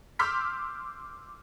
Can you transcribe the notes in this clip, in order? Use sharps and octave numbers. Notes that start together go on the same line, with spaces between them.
C6 D6 E6 F6 G6 B6